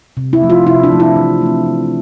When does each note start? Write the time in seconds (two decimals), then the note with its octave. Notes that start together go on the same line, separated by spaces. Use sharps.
0.17 C3
0.33 E4
0.41 F3 A3
0.50 F4
0.67 C3 E4
0.84 D4
0.92 F3 A3
1.00 E4
1.16 E3
1.42 A3 C4
1.66 E3